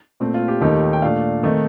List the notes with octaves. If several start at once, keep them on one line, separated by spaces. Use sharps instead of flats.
A#2 A3 C4
F4
G4
D#2 D#3 A3 D#4 G4
G5
A#2 A3 D4 F5
D#3 A3 C4 D#4